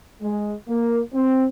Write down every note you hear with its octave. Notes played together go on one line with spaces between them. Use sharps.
G#3
A#3
C4